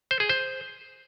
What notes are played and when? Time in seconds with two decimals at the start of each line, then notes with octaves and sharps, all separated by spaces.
0.11 C5
0.20 G#4
0.29 C5